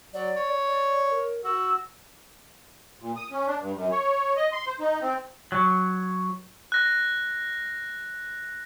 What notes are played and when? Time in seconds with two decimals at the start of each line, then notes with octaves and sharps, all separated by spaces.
0.14 F#3 D5
0.36 C#5
0.68 D5
1.11 A#4
1.44 F#4 E6
3.01 A#2
3.16 D#6
3.31 C#4
3.47 D4
3.60 G2
3.75 F#2
3.91 C#5
4.36 D#5
4.52 C6
4.67 C5
4.80 D#4
5.02 C4
5.52 F#3
6.72 F#6 A#6